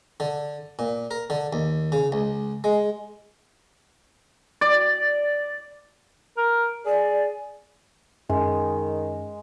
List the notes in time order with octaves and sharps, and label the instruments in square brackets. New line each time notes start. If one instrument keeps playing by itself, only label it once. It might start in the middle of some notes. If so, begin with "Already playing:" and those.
[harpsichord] D3
A#2
A#4
D3
D#2
C#3
C#2
G#3
[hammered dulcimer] D5
[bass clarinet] A#4
[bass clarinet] G#4 [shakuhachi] D5
[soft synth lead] F#2 [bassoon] D#3 [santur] G#3